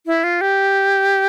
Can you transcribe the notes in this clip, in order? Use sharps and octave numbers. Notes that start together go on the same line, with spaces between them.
E4
F4
G4